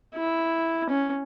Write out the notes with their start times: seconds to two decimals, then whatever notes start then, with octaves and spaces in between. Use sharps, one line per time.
0.15 E4
0.90 C#4